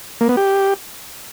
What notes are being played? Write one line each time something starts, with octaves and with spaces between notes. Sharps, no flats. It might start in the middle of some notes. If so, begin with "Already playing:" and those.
A#3
B3
G4